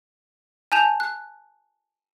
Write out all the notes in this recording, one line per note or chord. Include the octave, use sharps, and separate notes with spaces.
G#5 A5 G6 E7 F7
F#6